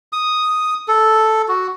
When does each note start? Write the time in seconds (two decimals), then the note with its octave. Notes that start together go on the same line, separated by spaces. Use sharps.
0.13 D#6
0.88 A4
1.48 F#4